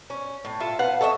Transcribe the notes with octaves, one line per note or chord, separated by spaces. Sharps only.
C#4
A2
F4 A4 E5
B4 F5 F#5
A4 C#5 D#5 E5